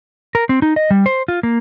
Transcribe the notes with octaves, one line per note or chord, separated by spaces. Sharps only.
A#4
C4
D#4
D#5
G3
C5
F4
A#3